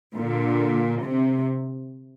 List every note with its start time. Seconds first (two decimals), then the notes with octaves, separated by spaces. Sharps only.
0.14 A#2 D3
1.03 C3